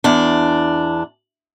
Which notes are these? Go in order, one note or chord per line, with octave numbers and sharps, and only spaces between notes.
E2 D4